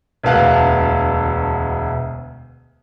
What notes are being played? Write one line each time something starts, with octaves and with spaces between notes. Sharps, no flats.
E1 D2 B3 F5 A5 F#6